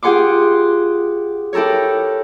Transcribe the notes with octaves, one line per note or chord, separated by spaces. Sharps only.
F4 G4 G#4 F#5 C6 D6
E4 G4 A4 A#4 C#5